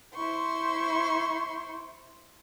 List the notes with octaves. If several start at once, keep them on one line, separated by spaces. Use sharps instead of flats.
E4 C5 C6 C#6